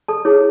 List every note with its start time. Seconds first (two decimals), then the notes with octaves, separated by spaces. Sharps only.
0.08 A4 A5
0.25 E4 G#4 C#5